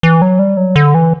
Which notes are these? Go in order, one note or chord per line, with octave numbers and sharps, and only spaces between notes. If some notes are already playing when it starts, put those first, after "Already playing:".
E3
F#3
G3
F#3
D3
E3